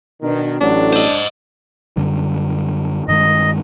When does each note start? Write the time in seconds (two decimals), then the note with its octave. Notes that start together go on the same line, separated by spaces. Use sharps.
0.22 B2 D#3 D4
0.61 A1 A2 F#3 D4
0.93 C5 D#5
1.97 F#2 D3 G3
3.08 G2 D#3 G#3 D#5